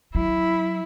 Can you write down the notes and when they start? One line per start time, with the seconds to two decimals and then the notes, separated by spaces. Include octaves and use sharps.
0.15 F#3 E4